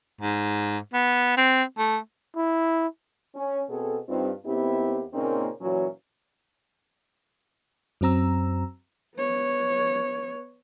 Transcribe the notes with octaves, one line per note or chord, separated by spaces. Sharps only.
G#2
B3
C4
A3
E4
C#4
B2 C4 G#4 A4
G2 G3 C4 D#4 F4
D#2 B3 C4 E4 G4
A#2 C#3 A#3 C4 C#4 D#4
A#2 E3 F#3 C#4 F#4
F#2 F#3 C4 A#5 E6
B3 C#5